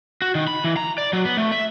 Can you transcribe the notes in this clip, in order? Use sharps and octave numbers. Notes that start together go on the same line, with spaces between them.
F#4
D#3
B5
E3
A#5
D5
F#3
B3
A3
E5